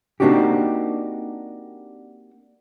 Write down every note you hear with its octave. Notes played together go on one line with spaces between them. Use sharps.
A#3 C4 D4 D#4 F#4 G4